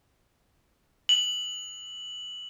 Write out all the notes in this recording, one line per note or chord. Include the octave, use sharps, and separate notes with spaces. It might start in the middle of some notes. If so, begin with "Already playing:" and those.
F#7